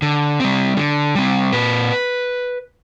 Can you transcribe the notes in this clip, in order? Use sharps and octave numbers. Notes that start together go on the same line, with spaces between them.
D3
G3 C4
D3
G3 C4
A#2 B4